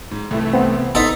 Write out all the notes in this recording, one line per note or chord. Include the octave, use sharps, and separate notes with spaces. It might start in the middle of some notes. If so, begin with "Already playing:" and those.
G#2
C2 E3 A3
B3 C4
A1 B3 D#4 A4 C6 B6